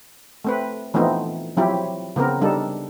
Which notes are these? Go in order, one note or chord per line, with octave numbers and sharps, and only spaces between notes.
A3 C4 B4
E3 F3 A3 B3 C4 D#4
F3 F#3 C4 E4 G4
C#3 B3 C4 A#4
G3 D4 D#4 A4